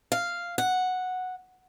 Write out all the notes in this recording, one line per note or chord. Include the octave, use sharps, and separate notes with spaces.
F5
F#5